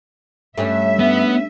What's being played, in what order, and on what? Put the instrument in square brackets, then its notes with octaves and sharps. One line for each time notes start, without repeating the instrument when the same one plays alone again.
[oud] G2 [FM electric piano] A3 C#4 [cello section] E5
[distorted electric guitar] B3